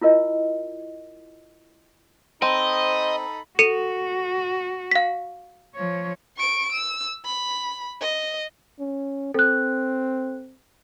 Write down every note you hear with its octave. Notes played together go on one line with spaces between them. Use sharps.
E4 F4 A#4 D#5
C4 D#4 A4 C5 D#5 B5
F#4 A4 C#7 D#7
F5 B6
F3 C#5
C#6 D7
E6
B5
D#5
C#4
C4 A4 F#6